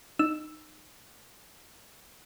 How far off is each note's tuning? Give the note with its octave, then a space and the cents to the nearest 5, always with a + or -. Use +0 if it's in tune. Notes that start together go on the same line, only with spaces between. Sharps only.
D#4 -20 E6 +0